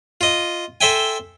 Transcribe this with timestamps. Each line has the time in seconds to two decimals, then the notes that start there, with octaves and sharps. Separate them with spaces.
0.21 F4 D#5
0.81 A4 C5 E5 G5 G#5